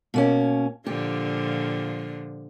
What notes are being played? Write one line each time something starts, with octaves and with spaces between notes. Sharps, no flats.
B2 A#3 C#4
A#2 D3 F3 G4